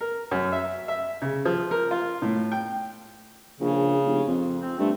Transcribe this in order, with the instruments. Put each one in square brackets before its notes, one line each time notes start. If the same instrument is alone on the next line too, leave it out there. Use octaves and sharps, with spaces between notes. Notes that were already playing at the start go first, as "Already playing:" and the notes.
[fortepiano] A#4
F#2
E5
E5
C#3
F3
A#4
F4
A2
G5
[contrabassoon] A#1 [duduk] C#3
[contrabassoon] F1
F2
[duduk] C4
[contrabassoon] G2 [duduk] A3